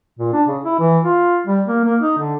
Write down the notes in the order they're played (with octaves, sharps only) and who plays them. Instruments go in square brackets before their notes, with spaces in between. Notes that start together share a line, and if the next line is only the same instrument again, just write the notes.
[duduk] A#2
D4
C#3
E4
E3
F4
G3
A#3
A#3
D#4
D3